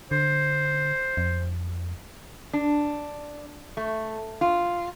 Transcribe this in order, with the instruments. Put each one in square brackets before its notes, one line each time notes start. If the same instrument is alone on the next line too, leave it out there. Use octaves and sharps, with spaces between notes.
[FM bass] D3 [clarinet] C5
[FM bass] F2
[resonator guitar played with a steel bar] D4
A3
F4